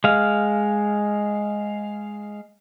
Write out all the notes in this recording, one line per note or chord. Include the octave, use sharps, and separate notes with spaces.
G#3 F5